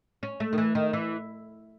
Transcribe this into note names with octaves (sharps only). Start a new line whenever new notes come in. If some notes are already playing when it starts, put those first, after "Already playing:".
C#4
A3
D#3
E3
D#3
E3